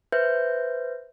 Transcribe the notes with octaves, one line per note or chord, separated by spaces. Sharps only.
B4 C5 E5 G6